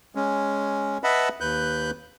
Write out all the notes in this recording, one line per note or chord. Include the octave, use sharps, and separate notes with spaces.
G#3 C#4
B4 D#5 E5 F#5 A5 B5
D#2 B4 F#6 G6